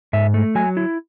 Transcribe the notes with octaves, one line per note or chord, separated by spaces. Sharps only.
G#2 E5
A3
F#3 G#5
E4